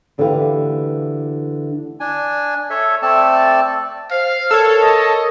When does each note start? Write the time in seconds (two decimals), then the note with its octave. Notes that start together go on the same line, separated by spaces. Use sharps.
0.18 D2 D3 E3 G4 B4 F5
2.00 D4 G#5
2.70 A4 C#5 E5
3.02 A3 C4 A4 D5 A5
4.11 C5 F5
4.51 A4 A#4 C#5
4.82 D#5